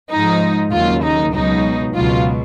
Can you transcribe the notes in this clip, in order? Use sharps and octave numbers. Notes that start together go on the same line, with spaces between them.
G#2 F3 D#4
D#2 C#3 F#3 F4
D#4
C#2 B2 F#3 D#4
C#2 B2 F#3 F4